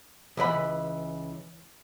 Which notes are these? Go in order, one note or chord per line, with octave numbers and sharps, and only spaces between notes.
C#2 E3 D5 B5